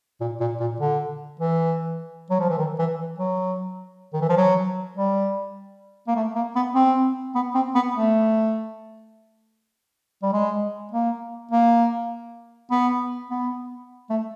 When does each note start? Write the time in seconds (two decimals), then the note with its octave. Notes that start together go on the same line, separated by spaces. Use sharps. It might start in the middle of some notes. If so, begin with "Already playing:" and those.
0.20 A#2
0.40 A#2
0.60 A#2
0.80 D3
1.40 E3
2.30 F#3
2.40 F3
2.49 E3
2.58 D#3
2.79 E3
3.18 F#3
4.13 D#3
4.21 E3
4.29 F3
4.37 F#3
4.97 G3
6.07 A#3
6.16 A3
6.36 A#3
6.55 B3
6.75 C4
7.35 B3
7.55 C4
7.75 B3
7.95 A3
10.22 G3
10.33 G#3
10.91 A#3
11.51 A#3
12.71 B3
13.30 B3
14.10 A3